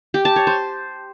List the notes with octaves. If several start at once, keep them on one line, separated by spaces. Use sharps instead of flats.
G4
A5
C#5
C5